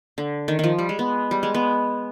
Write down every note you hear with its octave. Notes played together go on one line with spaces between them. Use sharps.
D3
D#3
D#3 F3
G3
G#3
B3
G3
G#3
B3